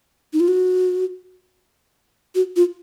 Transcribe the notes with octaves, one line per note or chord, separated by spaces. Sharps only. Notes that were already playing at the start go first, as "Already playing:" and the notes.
D#4
F4
F#4
F#4
F4